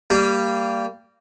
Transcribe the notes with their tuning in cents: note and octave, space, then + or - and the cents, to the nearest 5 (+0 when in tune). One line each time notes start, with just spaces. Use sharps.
G3 +0 A#3 -20